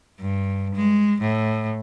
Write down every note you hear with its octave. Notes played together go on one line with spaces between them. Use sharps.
G2
G#3
A2